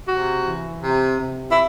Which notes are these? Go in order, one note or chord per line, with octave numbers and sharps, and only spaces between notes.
C3 F#4
E3
C3
C3
E4